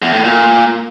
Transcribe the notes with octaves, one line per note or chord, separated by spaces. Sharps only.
E2
A2
A#2